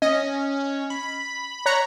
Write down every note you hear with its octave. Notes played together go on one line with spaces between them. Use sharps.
C#4 D#5
B5
C#5 A#5 F#6